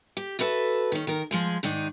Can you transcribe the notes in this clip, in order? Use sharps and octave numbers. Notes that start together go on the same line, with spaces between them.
G4
F#4 A4 B4 C#5 E5
D#3 C#4
D#3 A#4
F3 G#3 G#4
G#2 D#3 D4 D#4